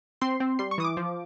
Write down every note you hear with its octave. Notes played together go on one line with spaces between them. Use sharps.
C4 C6
C4
G3 C6
C#6
E3 D#6
D6
F3